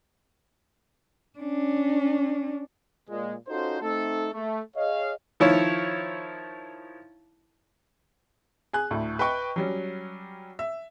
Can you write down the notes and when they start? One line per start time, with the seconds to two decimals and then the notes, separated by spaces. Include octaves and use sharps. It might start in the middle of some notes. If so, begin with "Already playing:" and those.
1.39 C#4 D4
3.09 A#2 G#3
3.49 C#4 D#4 F4 F#4 A4 C5
3.81 A3 C4 D#4 A4
4.33 A3
4.76 G#4 C#5 D#5 F5
5.40 D#3 F3 E4 C#5
8.73 G#4 G#5 F#6
8.91 D2 A2
9.19 B4 D#5 G5 C#6
9.56 F#3 G3 C#4
10.59 E5